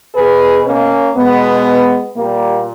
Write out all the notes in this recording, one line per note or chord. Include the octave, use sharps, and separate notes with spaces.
B2 G#4 B4
A#3 C#4
B2 G#3 B3
A#2 G3 A#3